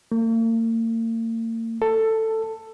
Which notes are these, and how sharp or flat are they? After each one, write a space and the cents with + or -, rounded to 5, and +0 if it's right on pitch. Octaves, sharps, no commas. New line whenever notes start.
A#3 -45
A4 +10